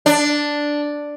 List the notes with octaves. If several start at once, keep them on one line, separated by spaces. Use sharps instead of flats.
D4